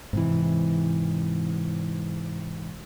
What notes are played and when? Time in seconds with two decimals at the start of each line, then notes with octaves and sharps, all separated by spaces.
0.13 G#2 C3 E3